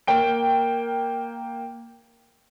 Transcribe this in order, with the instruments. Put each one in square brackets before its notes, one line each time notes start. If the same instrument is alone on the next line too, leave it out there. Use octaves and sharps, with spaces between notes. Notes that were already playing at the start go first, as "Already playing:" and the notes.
[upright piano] A#3 G5 D7